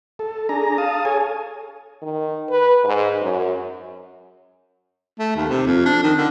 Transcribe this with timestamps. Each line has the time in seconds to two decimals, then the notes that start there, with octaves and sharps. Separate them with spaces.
0.19 A4
0.49 D4 G#4 A#5
0.78 F5 A5 D#6
1.05 G#4 A4 C#5 G#5
2.02 D#3
2.49 B4
2.85 G#2
3.22 F#2
5.19 A3
5.36 D#2
5.49 C3
5.67 F2
5.85 D4
6.03 D#3
6.17 D3